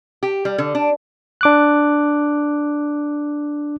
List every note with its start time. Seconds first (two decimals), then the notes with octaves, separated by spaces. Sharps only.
0.23 G4
0.45 G3
0.58 D3
0.75 D4
1.41 D4 D6 F#6